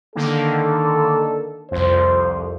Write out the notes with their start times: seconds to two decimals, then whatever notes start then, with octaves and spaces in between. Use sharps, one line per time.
0.15 D3 D#3 A#3 A4
1.71 C2 F2 C5